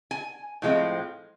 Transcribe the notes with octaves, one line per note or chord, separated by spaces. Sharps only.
G#5
A2 F3 G#3 C4